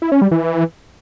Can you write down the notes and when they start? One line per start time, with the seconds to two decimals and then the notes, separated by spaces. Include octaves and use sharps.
0.02 E4
0.12 C#4
0.22 G3
0.31 E3